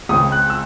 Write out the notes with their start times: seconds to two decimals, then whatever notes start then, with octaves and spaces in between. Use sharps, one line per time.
0.09 C#2 C#3 G#3 C4 D#6
0.32 F#6
0.50 E6